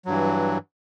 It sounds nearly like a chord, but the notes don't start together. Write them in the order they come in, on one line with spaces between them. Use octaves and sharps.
F#3 G2 E3